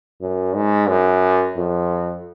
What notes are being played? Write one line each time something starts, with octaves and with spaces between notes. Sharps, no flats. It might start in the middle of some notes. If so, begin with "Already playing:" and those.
F#2
G#2
F#2
F2